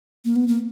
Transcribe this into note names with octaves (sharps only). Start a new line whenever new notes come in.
A#3
B3
A#3